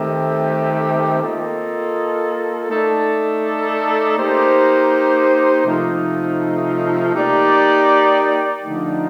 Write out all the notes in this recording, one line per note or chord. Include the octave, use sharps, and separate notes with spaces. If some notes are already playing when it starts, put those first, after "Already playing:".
Already playing: D#3 A3 C4 G4
A#3 F4 A4 D#5
A3 D#4 A4 D5
A#3 D#4 G4 C5
C3 F3 A3 D#4
A#3 D#4 G4 D5
D3 F3 A3 D#4